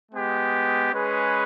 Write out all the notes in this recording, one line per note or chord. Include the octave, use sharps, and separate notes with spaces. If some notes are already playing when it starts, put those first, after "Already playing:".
G#3 B3 G4
G#3 C#4 G#4 B4